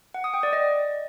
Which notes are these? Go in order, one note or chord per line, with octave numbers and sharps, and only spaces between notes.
F#5
D#6
G5
D5
D#5